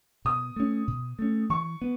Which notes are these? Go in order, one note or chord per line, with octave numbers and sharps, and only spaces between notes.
B2 D#6
A3 C#4
B2
A3 C#4
E3 C#6
B3